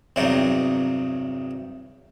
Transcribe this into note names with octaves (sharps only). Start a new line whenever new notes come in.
E2 G2 C3 F#3 D#4